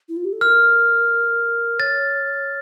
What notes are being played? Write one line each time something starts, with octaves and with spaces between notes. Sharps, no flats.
E4
F4
G4
A4
A#4 F6
C#5 A6